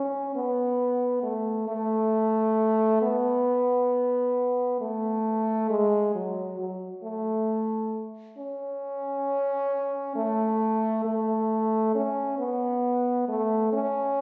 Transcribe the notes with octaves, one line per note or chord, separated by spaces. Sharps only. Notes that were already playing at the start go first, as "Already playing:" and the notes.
Already playing: C#4
B3
A3
A3
B3
A3
G#3
F#3
F#3
A3
C#4
A3
A3
C#4
B3
A3
C#4